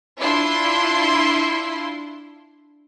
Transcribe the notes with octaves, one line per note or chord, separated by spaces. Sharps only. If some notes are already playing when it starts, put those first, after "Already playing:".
D4 E4 F4 C6